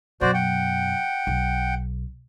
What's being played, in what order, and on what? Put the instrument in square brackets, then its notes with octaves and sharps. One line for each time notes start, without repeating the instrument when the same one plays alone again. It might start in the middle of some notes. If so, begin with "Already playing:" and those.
[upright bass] F#2 B2 [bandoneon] F#4 C5 D5
[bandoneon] F#5 G5
[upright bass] B1